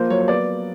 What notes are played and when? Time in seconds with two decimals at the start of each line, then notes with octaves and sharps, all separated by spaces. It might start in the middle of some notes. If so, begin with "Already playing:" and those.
Already playing: F3 A#3 C5
0.10 F#3 C#5
0.20 C#5
0.28 B3 D5